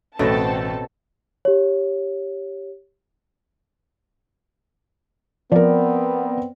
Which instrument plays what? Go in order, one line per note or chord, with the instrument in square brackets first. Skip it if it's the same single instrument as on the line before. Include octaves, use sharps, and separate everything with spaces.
[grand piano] A1 A#6 [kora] B2 F#3 [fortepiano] A3 [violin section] C4 A4 A5
[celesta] G4 C#5
[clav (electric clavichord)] F3 [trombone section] B3 C4 [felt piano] A#4 D5